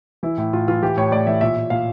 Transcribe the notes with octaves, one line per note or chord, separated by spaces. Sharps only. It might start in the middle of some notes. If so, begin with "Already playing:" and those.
E3 E4
A2 E4
A2 F4
E3 F4
E3 G4
A2 C#5
A2 D5
E3 E5
A#2 E5
A#2
A#2 F5